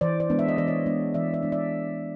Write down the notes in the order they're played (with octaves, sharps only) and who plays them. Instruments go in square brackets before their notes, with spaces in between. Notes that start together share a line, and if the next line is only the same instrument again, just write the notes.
[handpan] E3 C5 D5
C5 D5
G#3 B3 D4
E5
D#5
E3 D5
C#5 D#5
G#3 B3 D4
E3 D5 E5
D5 E5
G#3 B3 D4
D5 E5